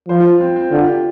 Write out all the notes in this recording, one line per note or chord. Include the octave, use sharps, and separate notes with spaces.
F3 C5
F4
C4
C4
D3 F4
G4